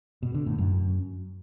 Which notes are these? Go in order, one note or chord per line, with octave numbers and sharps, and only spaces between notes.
B2
D3
A2
F#2